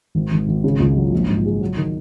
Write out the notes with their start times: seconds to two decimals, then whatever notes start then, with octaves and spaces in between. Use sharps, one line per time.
0.15 G#1
0.32 G#1
0.48 G#1
0.64 C#3
0.80 C#2
0.97 F#3
1.13 A#1
1.29 G#2
1.45 G#3
1.61 F#3
1.77 D#3